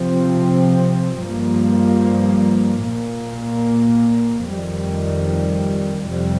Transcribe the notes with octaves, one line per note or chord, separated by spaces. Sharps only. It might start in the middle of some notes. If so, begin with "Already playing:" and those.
Already playing: C3 F3 C4
G2 F3 A#3
A#2 A#3
F2 D#3 G3
F2 C3 G3